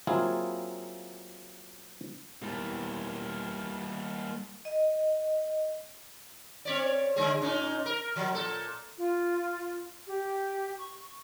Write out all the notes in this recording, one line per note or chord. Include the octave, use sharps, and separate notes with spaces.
F#3 A#3 C4 E4 F4 G#4
E2 G3 A#3
D#5
C4 C#5 D5
D3 G#3 G#4
A#2 C#4 D#4
A#4
F3 F#3
A#2 A4
F4
G4
C#6